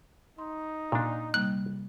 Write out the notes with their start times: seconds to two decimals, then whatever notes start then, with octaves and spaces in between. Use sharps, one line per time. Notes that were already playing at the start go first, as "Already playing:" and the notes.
0.38 D#4 C6
0.92 A#2 D4
1.34 C3 G3 A#3 F#6